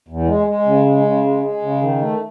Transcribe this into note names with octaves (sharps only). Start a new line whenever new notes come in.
E2
G#3
G#3
C#3
G#3
C#3
G#3
G#3
C#3
D#3
A3